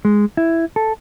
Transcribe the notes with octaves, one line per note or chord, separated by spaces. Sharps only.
G#3
E4
A4